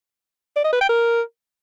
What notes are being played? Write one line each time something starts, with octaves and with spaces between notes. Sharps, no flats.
D5
D#5
B4
G5
A#4